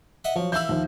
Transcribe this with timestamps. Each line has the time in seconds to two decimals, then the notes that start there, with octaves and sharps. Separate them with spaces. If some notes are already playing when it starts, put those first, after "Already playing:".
0.24 D#5 E5 F#5
0.36 F3 F#3
0.52 E3 F5 B5 E6 G6
0.69 D#2 F3